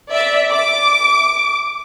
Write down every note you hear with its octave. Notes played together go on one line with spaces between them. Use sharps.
D5 E5
D6